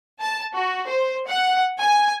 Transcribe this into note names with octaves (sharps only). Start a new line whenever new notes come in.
A5
F#4
C5
F#5
G#5